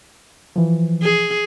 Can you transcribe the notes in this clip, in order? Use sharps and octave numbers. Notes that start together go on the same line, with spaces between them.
E3 F3
G#4